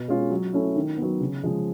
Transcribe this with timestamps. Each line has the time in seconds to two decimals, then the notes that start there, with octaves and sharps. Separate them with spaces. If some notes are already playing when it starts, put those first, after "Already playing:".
Already playing: B2
0.08 G#3 C#4 F4
0.31 F#3
0.53 A3 C#4 E4
0.76 D#3
0.98 F#3 B3
1.20 C#3
1.44 F3 G#3